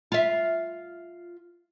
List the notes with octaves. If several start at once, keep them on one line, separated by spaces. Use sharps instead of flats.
F4 E5